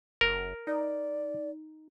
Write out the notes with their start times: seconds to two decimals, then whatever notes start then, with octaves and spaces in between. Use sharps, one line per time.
0.21 F#1 A#4
0.67 D#4 D5